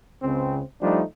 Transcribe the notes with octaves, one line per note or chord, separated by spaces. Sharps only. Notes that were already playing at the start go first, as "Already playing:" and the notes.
C#2 C#3 C4
F3 G3 A3 D4 D#4